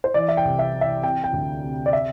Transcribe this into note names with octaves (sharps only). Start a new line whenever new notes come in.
C5
E3 D5
E5
G5
C2
E5
E3
E5
C3 G5
G5
D2
C3
D5
E5